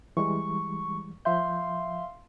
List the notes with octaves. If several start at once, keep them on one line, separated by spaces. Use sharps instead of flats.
E3 G3 G#3 C#6
F3 E5 F5 C6 G6